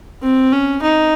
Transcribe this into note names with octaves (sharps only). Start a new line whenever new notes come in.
C4
C#4
D#4